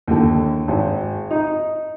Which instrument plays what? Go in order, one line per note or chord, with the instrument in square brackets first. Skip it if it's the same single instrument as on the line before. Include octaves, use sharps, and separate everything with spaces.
[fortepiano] D#2 D3
G#1
D#4